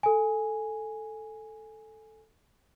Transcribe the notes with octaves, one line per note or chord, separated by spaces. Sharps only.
A4 G#5